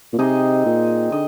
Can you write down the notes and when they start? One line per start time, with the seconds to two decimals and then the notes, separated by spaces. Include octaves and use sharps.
0.13 A#2
0.18 C3 C4 D#4 G#4 D#5
0.66 A#2
1.12 D3 D#5